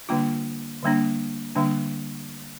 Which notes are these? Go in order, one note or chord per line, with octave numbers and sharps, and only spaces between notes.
D3 G3 A#3 D4 F4
D3 G3 A#3 D4
D3 G3 A#3 D4